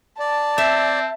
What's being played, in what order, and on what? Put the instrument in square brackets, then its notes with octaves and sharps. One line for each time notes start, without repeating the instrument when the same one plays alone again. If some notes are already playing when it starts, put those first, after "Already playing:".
[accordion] D5 [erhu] A5
[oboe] C4 [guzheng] E5